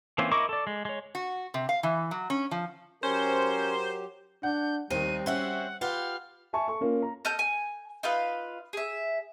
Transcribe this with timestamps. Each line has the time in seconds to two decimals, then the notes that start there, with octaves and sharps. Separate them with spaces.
0.18 E3 A#3 C4 C#4 F4
0.32 E4 A#4 D#5 C#6 D6
0.49 A4 D5
0.67 G#3
0.85 G#3 C#5
1.15 F#4
1.54 C3
1.69 F5
1.83 E3
2.11 F#3
2.30 C#4
2.51 F3
3.03 F#3 C#4 G4 A#4 C5
4.43 D4 F#5 G6
4.90 D#2 D#3 G3 C4 D#7
5.26 C4 C#4 F#4 C5 E5 F#5
5.81 F4 G4 B4 F#5 F6
6.53 E5 G#5 A5 C#6
6.67 A4 C#6
6.80 A#3 C#4 F4
7.02 A#5
7.25 A4 D#5 F6 G6
7.39 G#5
8.03 D#4 F4 B4 F5
8.73 G#4 E5